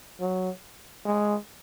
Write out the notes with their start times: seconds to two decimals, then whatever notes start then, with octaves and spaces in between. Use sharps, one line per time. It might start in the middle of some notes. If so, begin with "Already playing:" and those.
0.20 F#3
1.05 G#3